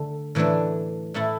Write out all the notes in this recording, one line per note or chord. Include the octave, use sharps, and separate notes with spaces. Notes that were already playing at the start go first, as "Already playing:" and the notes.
Already playing: D3 A3 A4
A2 E3 A3 D4
A2 A3 E4 A4